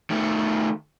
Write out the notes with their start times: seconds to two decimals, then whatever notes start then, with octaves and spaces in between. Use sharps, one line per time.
0.10 D#3 A3